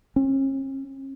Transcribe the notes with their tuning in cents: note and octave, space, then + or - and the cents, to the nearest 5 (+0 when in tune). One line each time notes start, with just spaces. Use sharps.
C#4 -45